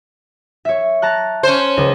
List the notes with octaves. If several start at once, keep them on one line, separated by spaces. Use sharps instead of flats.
C#5 E5
A5 A#5 F#6
C#4 C5
C#2 D#5